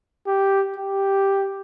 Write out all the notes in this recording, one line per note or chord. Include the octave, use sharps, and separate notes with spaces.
G4
G4